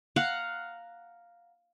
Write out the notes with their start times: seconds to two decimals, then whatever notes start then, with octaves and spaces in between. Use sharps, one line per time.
0.16 F5 F#5 A#5